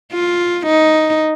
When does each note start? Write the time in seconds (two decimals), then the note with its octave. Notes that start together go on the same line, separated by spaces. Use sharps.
0.12 F4
0.67 D#4